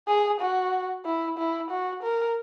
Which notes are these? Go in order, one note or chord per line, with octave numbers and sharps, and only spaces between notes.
G#4
F#4
E4
E4
F#4
A#4